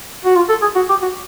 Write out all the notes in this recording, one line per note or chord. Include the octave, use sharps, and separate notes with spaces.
F#4
F4
A4
G#4
F#4
G4
F#4